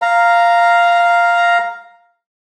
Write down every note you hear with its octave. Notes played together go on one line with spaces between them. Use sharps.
F5 A#5